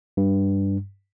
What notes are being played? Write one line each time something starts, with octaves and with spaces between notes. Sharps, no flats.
G2